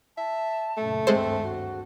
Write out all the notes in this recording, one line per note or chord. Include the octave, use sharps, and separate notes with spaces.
E5 A5
F#2 A#2 C#3 A3
G#1 D2 G2 G#3 C4 A4 C5
F#4